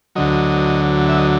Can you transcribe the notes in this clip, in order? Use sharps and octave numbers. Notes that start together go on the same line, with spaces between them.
D2 D3 F#3 D#5
E5
D#5